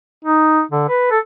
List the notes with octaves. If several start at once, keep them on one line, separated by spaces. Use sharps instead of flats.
D#4
D3
B4
A4